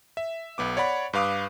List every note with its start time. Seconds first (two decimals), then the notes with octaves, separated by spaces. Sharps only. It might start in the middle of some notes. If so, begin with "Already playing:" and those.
0.17 E5
0.58 B1 B3 D6
0.77 C#5 D5 F#5 B5
1.13 G2 B4 F5 D6 D#6